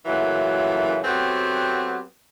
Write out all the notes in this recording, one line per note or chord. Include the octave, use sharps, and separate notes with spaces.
F#2 A#2 C#3 E3 F#3 A3
F#3 A3 B3 C4 F#4 G4